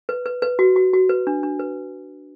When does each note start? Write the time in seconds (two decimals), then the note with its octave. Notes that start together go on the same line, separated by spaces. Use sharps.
0.09 B4
0.26 B4
0.42 B4
0.59 F#4
0.76 F#4
0.93 F#4
1.09 B4
1.27 D4
1.43 D4
1.59 B4